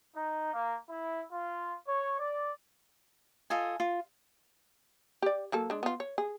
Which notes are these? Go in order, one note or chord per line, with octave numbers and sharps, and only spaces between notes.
D#4
A#3
E4
F4
C#5
D5
F4 A4 D#5 G#5
F4
G4 D5
F#3 A#3 A4
G#3 D4
B3 F4
C#5
G#4